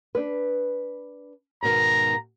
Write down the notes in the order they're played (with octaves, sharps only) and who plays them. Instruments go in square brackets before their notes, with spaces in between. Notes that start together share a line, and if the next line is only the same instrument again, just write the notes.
[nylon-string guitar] D4 B4
[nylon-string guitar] G#2 B2 D#3 [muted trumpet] A#5